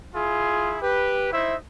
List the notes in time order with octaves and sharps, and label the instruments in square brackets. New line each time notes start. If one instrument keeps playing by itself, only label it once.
[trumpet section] E4 F4 G#4
G4 B4
D#4 E4 C5 E5